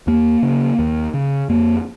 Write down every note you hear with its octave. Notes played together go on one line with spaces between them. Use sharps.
D#2 A#3
C#3
D#2
C#3
F2 A#3